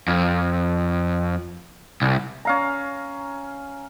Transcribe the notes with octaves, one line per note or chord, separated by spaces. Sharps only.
F2
C2
C#4 F5 A#5